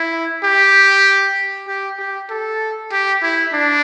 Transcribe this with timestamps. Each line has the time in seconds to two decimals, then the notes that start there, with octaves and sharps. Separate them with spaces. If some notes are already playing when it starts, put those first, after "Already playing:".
Already playing: E4
0.43 G4
1.68 G4
1.99 G4
2.29 A4
2.92 G4
3.23 E4
3.53 D4